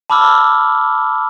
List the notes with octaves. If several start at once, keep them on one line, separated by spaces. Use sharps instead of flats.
A5 B5 D6 E6 F6